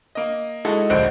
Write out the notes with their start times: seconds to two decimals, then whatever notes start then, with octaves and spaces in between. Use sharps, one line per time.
0.15 A#3 D#5
0.65 G#3 D#4 E4 F#4 A4
0.90 D1 A#1 C5 D#5 F#5 D7